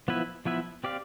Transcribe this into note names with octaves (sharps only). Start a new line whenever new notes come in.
F3 B3 E4 B4 E5
F3 B3 E4 B4 E5
C4 G4 D5 F5